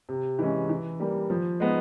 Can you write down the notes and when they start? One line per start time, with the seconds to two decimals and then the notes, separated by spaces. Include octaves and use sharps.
0.09 C3
0.39 E3 G#3 C#4
0.69 E3
1.00 G3 A#3
1.30 F3
1.60 G#3 B3 D#4